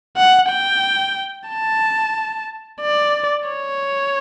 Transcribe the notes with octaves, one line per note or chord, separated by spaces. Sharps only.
F#5
G5
A5
D5
C#5